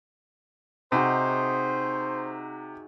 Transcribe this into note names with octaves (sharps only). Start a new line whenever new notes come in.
C3 D#4 F#4 G#4 C5